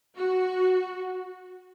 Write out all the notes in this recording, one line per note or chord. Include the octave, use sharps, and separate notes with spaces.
F#4